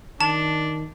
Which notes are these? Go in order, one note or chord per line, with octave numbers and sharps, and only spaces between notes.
D#3 D4 A5